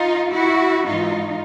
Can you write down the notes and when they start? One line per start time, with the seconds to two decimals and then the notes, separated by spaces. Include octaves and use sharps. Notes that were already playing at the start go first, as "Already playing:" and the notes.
Already playing: D#4 F4
0.33 E4 F#4
0.86 G#2 E3 D#4 F4